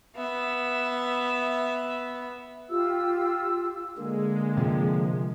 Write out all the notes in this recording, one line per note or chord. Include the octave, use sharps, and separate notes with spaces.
B3 E5
F4 G4 E6
D3 G#3 A#3
C3 F3